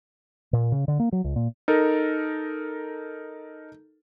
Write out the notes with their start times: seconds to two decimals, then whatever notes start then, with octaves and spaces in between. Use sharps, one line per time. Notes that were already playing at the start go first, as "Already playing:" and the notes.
0.53 A#2
0.72 C#3
0.88 D3
1.00 A#3
1.12 F#3
1.24 C#2
1.36 A#2
1.68 D#4 A4 A#4